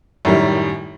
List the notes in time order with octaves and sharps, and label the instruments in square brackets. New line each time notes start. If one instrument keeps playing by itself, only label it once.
[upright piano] F#2 A2 D#3 G3